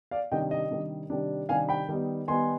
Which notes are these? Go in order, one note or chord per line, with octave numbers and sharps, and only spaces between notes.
D5 F5
C3 D#3 G3 D4 D#5 G5
D#5
C3 D#3 G3 D4
C3 D#3 G3 D4
C3 D#3 G3 D4 F5 G#5
G5 B5
D#3 G3 B3 D#4
D#3 G3 B3 D#4 G#5 C6